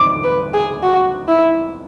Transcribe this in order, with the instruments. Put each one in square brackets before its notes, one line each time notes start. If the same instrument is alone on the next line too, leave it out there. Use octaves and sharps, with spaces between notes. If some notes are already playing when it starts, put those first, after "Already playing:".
Already playing: [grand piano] D6
[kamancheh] B4
G#4
F#4
E4